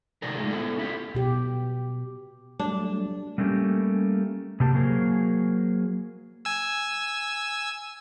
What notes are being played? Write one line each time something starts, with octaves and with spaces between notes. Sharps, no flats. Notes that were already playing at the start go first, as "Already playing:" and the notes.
C3 D#3 F#3 A3 D4 A#4
G#3 A3 D4 D#4 F4 G#4
B3 E4 A4
C#4 E4 F4 G4
B2 G4
F#3 G3 A3 D4
G3 A3 A#3 C#4 G4
C3 A#3 G4 A5
F#3 A#3 F#4 G#4 A#4 C5
G#5 E6